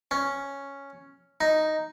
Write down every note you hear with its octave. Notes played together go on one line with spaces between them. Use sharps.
C#4
D#4